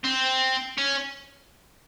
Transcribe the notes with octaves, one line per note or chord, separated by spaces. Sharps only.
C4
C#4